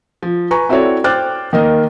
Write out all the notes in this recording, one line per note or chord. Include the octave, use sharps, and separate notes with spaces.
F3
B4 G#5 A#5 C#6
C4 E4 F#4 A4 C#5 D5
C5 G5 D6 F6 F#6 A6
D#3 A#3 D#5